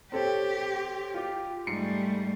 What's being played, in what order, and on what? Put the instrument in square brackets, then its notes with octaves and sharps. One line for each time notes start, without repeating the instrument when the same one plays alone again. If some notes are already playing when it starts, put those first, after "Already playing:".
[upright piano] C4 A4 C#5 [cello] G4
[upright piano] F4 G4
[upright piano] G#2 C7 C#7 [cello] G3 A3